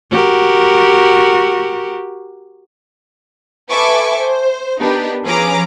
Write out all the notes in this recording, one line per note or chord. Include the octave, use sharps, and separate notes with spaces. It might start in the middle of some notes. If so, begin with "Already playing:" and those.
F#4 G4 A#4
A4 B4 E5 G#5 C#6 D6
C5
B3 D4 D#4 G4 A#4 B4
F3 C#4 G#4 B4 A#5 D6